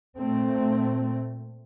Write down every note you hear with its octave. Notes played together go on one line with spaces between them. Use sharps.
A#2 A3 C4